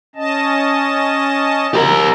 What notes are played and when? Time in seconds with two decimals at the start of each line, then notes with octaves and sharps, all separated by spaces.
0.15 C#4 D#5 A5
1.74 G4 A#4